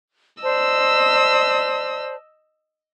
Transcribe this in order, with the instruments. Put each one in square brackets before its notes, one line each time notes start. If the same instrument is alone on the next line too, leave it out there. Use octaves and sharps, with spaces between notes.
[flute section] C5 D5 A5 [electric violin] D#5 E6